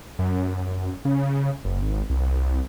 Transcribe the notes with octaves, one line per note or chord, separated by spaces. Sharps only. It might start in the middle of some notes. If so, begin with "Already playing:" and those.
F#2
C#3
F#1
G#1
C2